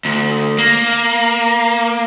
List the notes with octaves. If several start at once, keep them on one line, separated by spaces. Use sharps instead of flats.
D2
A#3